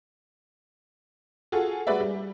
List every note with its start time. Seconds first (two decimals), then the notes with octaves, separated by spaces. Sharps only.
1.52 F4 F#4 G#4 A4
1.87 G3 G#3 F#4 B4 D5 E5
2.00 G3